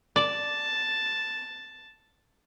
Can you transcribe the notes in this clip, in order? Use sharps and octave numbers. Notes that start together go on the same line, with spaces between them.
D5 A5